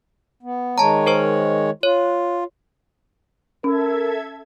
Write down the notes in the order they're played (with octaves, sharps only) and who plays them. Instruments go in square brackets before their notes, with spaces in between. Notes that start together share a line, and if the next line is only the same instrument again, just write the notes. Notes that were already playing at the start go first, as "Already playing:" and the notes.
[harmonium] B3
[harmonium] D#3 G#3 C#5 [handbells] A5 A#5
[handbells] A#4 C5 C#6
[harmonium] F4 [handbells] C#5
[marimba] C#4 [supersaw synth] A4 E5 G#6 [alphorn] A#4